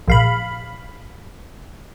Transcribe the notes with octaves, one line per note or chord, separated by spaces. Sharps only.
A#1 F5 B5